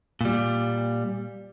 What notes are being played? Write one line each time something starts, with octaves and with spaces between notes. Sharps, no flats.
A#2 G3